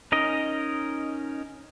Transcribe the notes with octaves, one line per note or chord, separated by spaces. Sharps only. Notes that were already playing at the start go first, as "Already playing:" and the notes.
C#4 D#4 A#4 D#5